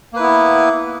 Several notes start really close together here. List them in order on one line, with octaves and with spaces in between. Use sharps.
A#3 B4 E4 B3